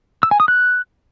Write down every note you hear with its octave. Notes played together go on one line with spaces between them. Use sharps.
E6
G#5
D#6
F#6